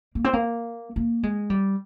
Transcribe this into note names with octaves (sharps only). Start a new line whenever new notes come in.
A#3
C4
A#3
A#3
G#3
G3